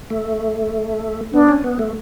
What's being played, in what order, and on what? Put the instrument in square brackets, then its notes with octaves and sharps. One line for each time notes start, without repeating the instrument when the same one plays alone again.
[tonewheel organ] A3
[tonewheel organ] B3 [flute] D4
[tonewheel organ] C#4
B3
A3